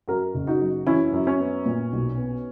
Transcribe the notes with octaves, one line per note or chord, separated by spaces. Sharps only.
F#2 F#4 A#4
F#1
D#4 F#4
F#3
E3 C#4 E4
F#2
C#4
B3
A#2
B1
B3